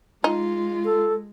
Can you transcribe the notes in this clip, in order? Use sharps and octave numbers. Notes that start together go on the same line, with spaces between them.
G#3 D#4 F4
A4